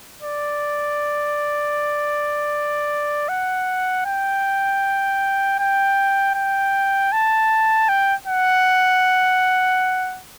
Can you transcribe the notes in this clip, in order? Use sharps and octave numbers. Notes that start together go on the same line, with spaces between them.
D5
F#5
G5
G5
G5
A5
G5
F#5